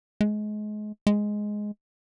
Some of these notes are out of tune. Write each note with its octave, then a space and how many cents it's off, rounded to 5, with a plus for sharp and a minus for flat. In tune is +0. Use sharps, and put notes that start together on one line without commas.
G#3 +30
G#3 +5